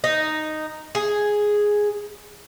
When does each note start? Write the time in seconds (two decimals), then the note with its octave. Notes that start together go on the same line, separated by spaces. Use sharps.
0.04 D#4
0.95 G#4